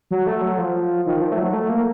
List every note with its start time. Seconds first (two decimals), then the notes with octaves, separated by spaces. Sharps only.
0.11 F#3
0.27 A3
0.42 F#3
0.58 F3
1.06 D#3
1.22 F3
1.32 A3
1.38 F#3
1.54 A3
1.69 A#3